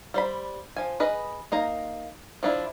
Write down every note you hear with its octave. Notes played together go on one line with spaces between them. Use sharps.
G3 C5 B5
F3 G#5
G#4 B4 D#5
A#3 D#4 A#5
F3 D4 E4